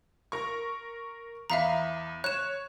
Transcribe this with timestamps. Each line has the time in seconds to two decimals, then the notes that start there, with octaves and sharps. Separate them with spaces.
0.32 A#4 C#6
1.50 E2 E5 F5 A#5 B5
2.24 C#5 F#6 E7